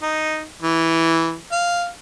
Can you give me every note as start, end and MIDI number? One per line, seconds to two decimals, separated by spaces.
0.03 0.44 63
0.63 1.37 52
1.52 1.88 77